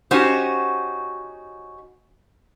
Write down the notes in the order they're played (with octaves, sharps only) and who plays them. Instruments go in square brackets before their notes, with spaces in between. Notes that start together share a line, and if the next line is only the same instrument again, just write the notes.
[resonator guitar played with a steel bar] C#4 D#4 F#4 G4 C5